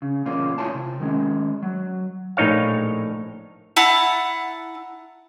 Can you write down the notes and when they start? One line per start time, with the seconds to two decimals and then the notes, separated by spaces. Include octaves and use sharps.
0.02 C#3
0.25 E2 A#2 A#3 C#4 F4
0.58 E4 F4 C#5 G#5 A5
0.74 C3
1.00 D#3 G#3 C#4
1.62 F#3
2.37 A#1 A2 D#4 C#5 F5
3.77 E4 F#5 A5 A#5